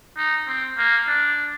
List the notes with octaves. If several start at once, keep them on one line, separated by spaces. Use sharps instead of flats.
D#4
C4
A#3
D4